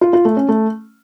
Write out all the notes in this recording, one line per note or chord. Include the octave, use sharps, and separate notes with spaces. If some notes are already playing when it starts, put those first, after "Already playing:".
F4
F4
A3
C#4
A3